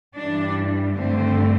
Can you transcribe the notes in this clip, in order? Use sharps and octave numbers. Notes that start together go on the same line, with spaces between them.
G2 E3 G3 D4
G2 D3 A3 C4